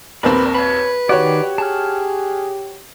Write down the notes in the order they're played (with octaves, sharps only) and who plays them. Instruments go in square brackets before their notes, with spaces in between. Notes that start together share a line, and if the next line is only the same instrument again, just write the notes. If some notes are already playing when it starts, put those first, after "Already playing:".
[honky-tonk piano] A#1 D#2 C4 [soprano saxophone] A#4 [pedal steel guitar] B4 D5 B5
[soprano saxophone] B4 [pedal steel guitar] C#5 B5
[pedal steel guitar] D#3 D5 [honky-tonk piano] F#4 C#5 [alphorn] G4
[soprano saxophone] G#4 [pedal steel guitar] A5 F6